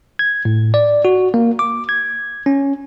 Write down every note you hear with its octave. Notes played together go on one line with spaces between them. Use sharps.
G#6
A2
D5
F#4
A#3
D6
G#6
C#4